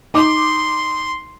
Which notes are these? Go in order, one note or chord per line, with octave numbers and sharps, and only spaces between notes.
D#4 C6 D6